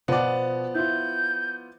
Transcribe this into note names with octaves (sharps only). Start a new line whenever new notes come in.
B2 F3 B3 D5 F#5
E4 F4 G6